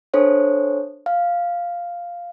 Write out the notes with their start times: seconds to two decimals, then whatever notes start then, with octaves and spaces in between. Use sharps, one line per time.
0.14 D4 A4 C5 C#5
1.06 F5